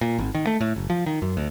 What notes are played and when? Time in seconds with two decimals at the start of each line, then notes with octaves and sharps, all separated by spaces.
0.01 A#2
0.19 G#1
0.35 D#3
0.47 A3
0.61 A2
0.76 F#1
0.90 F3
1.06 D#3
1.22 F#2
1.37 D2